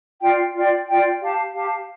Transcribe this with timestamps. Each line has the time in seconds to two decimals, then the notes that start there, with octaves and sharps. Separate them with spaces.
0.20 F4 D5 G5
0.53 F4 D5 G5
0.88 F4 D5 G5
1.20 G4 F5 A5
1.53 G4 F5 A5